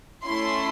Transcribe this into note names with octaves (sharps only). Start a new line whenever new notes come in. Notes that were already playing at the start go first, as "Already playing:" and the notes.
A3 C#4 E4 C6